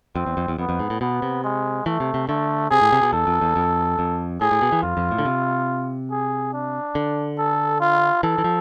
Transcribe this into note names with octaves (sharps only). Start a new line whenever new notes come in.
F2 C4
E2
F2
E2
F2 B3
F2
G#2
A2
B2 B3
C3
G#3
E3 A3
C3
C3
D3 A3
C3 G#4
A2
C3
B2
E2 A4
F2
E2
F2
F2
A2 G#4
A2
B2
E3
F2 F4
F2
A2
D3
C3
G#4
D4
D3
A4
F4
E3 A4
E3
F3